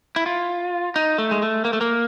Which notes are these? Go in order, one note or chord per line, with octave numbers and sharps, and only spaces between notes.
E4
F4
D#4
A3
G#3
A3
A#3
A3
A#3